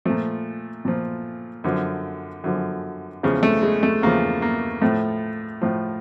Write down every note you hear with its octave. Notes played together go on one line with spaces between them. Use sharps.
A#2 F3 A3
A#2 F3
F#2 D3 F3
F#2 D3 F3
E2 C#3 F3 G#3
A3
G#3
A3
E2 C#3 F3 A#3
A#3
A2 F3 A3
A2 F3